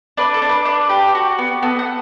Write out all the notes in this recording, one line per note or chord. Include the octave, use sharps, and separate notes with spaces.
D4 B4
A4
D4
B4
D4 B4
G4
F#4
B3
B3 A4
F#5